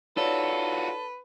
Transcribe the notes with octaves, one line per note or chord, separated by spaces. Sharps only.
D#4 F4 F#4 A4 B4 C#5 D5